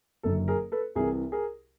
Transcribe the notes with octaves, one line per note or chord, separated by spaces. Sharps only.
F#1 F#2 D3 A4
G#4 A#4
A4 B4
C2 C3 E3 G#4 A#4
G#4 A#4